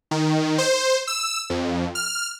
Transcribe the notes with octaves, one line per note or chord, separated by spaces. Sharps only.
D#3
C5
E6
F2
F6